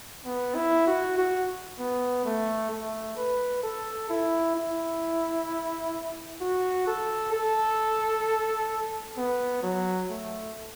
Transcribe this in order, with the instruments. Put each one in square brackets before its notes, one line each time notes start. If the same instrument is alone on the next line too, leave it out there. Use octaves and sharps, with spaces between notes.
[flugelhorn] B3
E4
F#4
F#4
B3
A3
A3
B4
A4
E4
E4
F#4
A4
A4
B3
F#3
A3